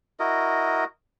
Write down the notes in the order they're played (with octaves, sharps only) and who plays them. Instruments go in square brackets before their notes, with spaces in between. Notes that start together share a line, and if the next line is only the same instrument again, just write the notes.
[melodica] E4 F#4 A#4 D#5